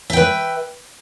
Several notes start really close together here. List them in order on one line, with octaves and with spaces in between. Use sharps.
E5 G5 B4